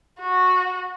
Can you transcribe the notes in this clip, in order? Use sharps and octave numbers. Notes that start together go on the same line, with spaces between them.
F#4